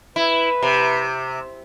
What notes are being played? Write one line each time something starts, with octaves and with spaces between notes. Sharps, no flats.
E4 B4
C3